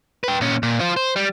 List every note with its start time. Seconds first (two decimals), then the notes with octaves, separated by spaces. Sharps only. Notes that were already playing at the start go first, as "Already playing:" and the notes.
0.24 B4 G5
0.41 A#2 C#4
0.63 A#2
0.80 F4 C5
0.97 C5
1.16 G3